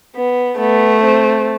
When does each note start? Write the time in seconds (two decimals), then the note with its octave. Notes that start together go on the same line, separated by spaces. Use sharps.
0.14 B3
0.58 A3 B3
1.03 C4